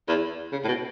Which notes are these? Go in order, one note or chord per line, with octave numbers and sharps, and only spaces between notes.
E2
C#3
A2
B2